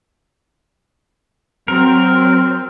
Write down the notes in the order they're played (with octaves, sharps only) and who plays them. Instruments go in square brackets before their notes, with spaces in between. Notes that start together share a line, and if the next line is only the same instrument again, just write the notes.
[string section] F#3 C4 [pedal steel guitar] A#4